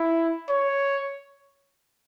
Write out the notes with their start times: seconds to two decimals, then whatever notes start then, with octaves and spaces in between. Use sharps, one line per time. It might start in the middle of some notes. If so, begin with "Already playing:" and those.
Already playing: E4
0.49 C#5